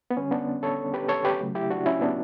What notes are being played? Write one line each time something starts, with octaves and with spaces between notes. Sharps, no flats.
B3
D3 G3 C#4
B3 D4
A4 C#5
G4 B4
A4 C#5
G4 B4
C#3 F#3 A3
E4 G4
D4 F#4
C#4 E4
B3 D4